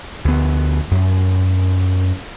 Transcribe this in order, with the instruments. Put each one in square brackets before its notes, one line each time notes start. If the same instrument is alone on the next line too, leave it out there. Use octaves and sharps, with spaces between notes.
[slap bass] D2 B3
F#2